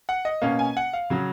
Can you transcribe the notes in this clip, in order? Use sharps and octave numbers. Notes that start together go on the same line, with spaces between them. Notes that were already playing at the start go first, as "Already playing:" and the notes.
F#5
D#5
B2 A#3 C#4 F5
G#5
F#5
F5
C#3 F#3 C#4